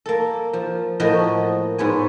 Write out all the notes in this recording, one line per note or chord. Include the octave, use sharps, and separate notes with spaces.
A#3 A4
F3
A2 F3 A#3 F#4 D#5
G#2 B3 C#5 G#5